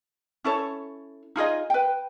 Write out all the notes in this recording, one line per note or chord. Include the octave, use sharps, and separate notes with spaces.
C#4 E4 A4 C#5
D#4 F4 G#4 D#5
B4 G5